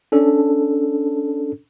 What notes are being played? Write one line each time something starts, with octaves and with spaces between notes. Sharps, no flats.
C#4 D4 A4